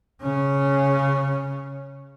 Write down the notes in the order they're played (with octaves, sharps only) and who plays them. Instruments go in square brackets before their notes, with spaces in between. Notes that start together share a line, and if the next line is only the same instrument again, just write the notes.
[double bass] C#3 C#4